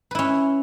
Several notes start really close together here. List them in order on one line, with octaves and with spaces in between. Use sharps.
B4 E4 C#4